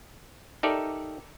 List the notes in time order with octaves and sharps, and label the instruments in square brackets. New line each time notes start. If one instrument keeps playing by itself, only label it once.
[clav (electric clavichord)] D#4 G4 A4 A#4 D5 E5